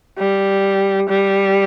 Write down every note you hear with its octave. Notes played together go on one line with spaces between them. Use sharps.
G3
G3